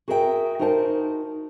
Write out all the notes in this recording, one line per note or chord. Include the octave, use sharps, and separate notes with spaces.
F#4 G#4 A#4 B4 E5 G5
D#4 F#4 A#4 C5 F#5 A5